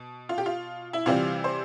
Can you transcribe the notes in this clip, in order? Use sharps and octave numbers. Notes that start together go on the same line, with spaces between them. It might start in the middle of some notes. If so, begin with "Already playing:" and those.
Already playing: B2
F4
G4
F4
E4
C3 E3 G3 C4 F4
C5